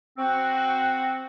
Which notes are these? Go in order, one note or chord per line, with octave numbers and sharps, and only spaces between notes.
C4 F#4